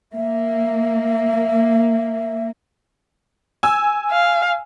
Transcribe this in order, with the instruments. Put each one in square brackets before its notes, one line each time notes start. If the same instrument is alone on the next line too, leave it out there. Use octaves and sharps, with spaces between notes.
[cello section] A#3 [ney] E5
[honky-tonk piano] G#5 E6
[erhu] F5